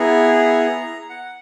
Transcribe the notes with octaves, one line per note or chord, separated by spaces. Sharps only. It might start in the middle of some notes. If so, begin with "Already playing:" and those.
Already playing: B3 E4 G#4 A#5
F#5